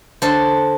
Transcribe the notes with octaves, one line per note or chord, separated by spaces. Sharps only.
D3 A4 C5